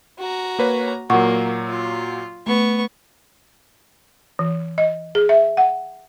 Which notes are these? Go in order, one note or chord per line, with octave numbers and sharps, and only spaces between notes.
F#4 A#5
A#3 B4 C#5
A#2 F#3 A#3 F#5 C#6
F4
A3 B3 C#6
E3
D#5
G#4
E5
F#5